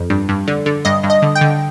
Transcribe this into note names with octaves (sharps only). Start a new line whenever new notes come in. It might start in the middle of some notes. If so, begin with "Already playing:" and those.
Already playing: F2
G2
G2
D3
D3
G2 D#5
G2
D#5
D3
G5
D3